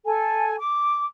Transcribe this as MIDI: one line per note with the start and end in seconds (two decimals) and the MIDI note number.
0.05 0.55 69
0.05 0.55 80
0.58 1.04 86